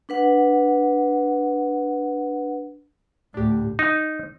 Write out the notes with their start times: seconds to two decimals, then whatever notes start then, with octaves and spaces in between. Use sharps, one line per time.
0.09 D4 B4 F#5
3.34 D2 A2 D4 G4
3.79 D#4